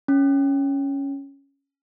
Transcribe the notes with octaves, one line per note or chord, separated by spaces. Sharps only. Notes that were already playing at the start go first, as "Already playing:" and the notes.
C#4